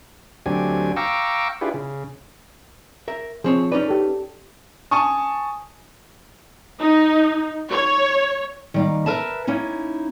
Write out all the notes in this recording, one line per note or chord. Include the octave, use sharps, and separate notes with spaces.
D2 F#3 C4 D4 G4 G#5
F5 G5 A#5 C#6 D6 E6
D4 E4 F4 G4 G#4 B4
C#3
A#4 E5
F3 C4 G#4 C#5
C#4 D#4 B4 D5
G4 A4
G#5 A5 C#6 D#6
D#4
C#5
D#3 G3 A#3
A#4 B4 E5 A5
A#3 C#4 D#4 E4